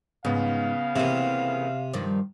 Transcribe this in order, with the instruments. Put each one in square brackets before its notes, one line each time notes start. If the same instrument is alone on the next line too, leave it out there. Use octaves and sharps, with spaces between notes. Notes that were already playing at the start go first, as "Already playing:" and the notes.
[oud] G#2 [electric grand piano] C#3 B3 [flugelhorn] F5
[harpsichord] C3 [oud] E3 A#3
[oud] G2 D#3 F3